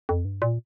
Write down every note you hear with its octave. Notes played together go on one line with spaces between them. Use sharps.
F2
G2
A#2